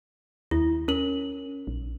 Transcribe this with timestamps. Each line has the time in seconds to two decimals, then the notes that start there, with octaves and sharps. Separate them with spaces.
0.51 D#2 E4
0.88 C#4 A#4 F#7
1.67 A#1